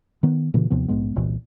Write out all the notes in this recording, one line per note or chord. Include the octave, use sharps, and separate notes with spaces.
D#3 B3
A#2 C#3 E3
D#2 C3 F3 B3
A#1 G#2 G#3 B3
E1 C2 A#2 E3